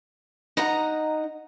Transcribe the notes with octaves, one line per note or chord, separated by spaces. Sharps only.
D#4 D#5 F#5 A#5